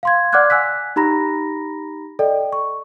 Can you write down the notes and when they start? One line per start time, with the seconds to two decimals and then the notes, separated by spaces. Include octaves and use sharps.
0.03 F5 C6 G#6
0.32 D5 F#5 D6 F6 F#6 G#6
0.50 F#5 G#5 E6 F#6 B6
0.96 D#4 G4 A#5 B5 A#6
2.19 A4 D5 D#5 G5
2.53 C#6